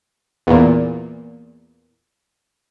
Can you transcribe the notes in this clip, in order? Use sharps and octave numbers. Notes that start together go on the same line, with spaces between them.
E2 A#2